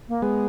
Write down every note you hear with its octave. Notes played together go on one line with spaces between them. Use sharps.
A#3
G#3 B3